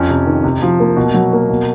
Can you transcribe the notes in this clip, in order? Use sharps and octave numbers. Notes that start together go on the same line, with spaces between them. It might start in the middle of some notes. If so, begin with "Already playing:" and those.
Already playing: F2 C#4
C3
D#3
C3
F3
A#3
B2
F#3
A#3
B2